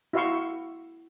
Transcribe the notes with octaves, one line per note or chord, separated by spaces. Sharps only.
E4 F#4 E5 F5 C6 C#6